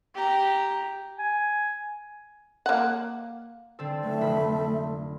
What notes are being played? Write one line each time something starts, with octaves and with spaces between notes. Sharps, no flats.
G4 A#5
G#5
A#3 F#5
D3 C4 A4
F#1 A3
F1 B5